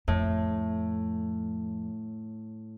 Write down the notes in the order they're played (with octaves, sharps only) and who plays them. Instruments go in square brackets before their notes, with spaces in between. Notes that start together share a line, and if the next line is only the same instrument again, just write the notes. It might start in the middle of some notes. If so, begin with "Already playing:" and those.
[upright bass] F2 [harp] A2